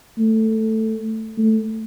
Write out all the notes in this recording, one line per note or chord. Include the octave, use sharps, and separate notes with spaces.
A3
A3